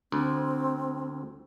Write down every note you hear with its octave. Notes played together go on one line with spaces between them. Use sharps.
D2 C4